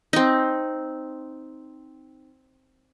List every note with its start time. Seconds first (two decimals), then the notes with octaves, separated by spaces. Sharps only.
0.13 C4 D#4